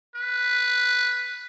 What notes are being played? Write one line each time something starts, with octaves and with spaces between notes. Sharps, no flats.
B4